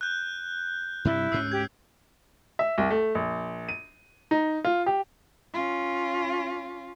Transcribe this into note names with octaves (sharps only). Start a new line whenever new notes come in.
F#6 G6
G2 C3 G3 E4
D2 G#2 C#4 E6 F#6 C7
G4 G#6
E5
C2
A3
A#1
D#7
D#4
F4
G4
C#4 F4